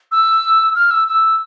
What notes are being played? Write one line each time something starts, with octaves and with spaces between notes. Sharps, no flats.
E6
F6
E6
E6